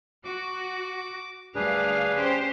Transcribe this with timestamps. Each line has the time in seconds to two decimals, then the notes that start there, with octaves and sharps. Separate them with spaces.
0.25 F#4 D6
1.55 D2 G3 D4 G#4 B4 F5
2.15 C#4 G4 C5